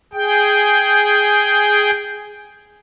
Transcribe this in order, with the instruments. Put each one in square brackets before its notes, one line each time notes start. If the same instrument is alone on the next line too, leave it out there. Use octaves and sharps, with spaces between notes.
[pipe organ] G#4 G5